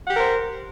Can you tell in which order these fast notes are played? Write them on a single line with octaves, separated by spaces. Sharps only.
F#5 G4 A#4 C5